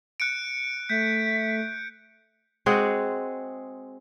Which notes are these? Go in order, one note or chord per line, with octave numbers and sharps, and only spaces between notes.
F#6 C#7 D7
A3 G6 B6
G#3 C4 F#4 G#4